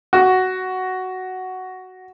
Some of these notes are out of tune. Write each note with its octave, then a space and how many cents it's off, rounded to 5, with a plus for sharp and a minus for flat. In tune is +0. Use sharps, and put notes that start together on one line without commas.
F#4 +5